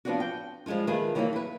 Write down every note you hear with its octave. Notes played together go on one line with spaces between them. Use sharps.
F3 G#3 B3 C4 D4 F#4
G5
F3 G3 G#3 D#4 F4
D#3 A3 F4 G#4 B4
D#3 E3 F#3 G3 A#3 D#4
E4 B4